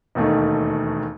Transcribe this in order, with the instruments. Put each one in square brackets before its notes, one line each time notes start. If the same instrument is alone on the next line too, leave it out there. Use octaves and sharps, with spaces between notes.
[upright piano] E1 D#2 D#3 A3 D#4